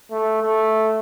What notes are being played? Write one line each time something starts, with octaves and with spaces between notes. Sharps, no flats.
A3
A3